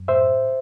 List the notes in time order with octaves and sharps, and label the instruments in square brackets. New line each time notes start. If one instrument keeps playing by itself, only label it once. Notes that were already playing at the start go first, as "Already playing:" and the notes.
Already playing: [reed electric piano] F#2
A2 C5 E5